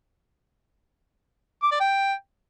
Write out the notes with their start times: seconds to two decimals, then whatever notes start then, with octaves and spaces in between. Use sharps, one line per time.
1.62 D6
1.71 D5
1.80 G5